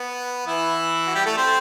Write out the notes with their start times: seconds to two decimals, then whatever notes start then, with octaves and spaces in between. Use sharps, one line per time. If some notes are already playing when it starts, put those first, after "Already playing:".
Already playing: B3
0.47 E3 E4
1.07 F#4
1.15 G3 G4
1.26 A3 A4
1.37 C4 C5